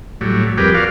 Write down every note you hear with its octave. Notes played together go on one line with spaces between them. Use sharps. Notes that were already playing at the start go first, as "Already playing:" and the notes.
A2 F#3 G3
F2 G3 G4 G#4 A#4 B4
F#4 A#4 D5 F5